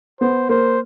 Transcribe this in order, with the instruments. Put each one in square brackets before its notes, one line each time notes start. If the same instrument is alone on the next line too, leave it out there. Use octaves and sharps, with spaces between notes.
[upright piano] B3 [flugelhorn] C5
[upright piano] A#3 [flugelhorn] C5